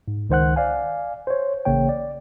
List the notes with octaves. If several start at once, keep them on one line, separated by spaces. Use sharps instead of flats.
G#2
C#2 D#3 C5 F#5 F#6
D5 F5 G#5
C5 C#5
A1 C#3 A#3 C#5 G5
D5